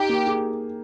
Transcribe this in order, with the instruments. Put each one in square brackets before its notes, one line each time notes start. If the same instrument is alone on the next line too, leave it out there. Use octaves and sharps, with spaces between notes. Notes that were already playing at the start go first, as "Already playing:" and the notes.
Already playing: [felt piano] D#4 [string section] G4
[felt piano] A#3
G#4